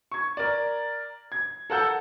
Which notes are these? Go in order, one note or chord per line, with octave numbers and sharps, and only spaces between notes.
C#6 G#6
A#4 D5
G#6
A4 A#4 F#5 A5 E6 G6